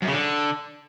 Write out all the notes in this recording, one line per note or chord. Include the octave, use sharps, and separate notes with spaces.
F#2
C#3
D3